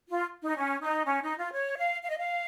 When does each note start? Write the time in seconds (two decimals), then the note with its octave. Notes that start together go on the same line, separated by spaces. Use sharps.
0.09 F4
0.42 D#4
0.57 C#4
0.81 D#4
1.05 C#4
1.22 D#4
1.37 F4
1.53 C#5
1.77 F5
2.02 F5
2.09 D#5
2.17 F5